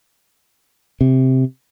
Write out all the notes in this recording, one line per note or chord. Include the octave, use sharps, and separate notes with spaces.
C3